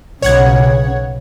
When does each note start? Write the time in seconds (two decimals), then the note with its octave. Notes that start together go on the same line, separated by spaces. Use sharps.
0.22 B1 C#3 C#5 F#5 G#6